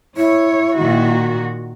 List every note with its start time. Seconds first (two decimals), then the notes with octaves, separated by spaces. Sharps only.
0.17 E4 C#5
0.79 A#2 D#3 F#4